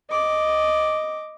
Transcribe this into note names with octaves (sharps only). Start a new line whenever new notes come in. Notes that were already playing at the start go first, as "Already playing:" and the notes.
D#5 D6